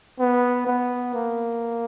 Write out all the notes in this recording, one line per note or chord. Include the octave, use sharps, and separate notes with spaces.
B3
B3
A#3